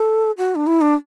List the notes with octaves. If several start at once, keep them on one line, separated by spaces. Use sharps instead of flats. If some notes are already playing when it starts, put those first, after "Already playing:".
Already playing: A4
F#4
D4
E4
D4